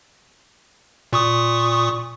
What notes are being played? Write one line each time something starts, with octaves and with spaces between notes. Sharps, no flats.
A#2 C#6 D#6